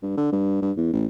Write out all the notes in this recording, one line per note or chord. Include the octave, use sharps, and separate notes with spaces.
G2
D3
G2
G2
E2
A1